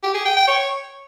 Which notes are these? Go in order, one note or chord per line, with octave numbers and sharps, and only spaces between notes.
G4
G#4
G5
G5
C#5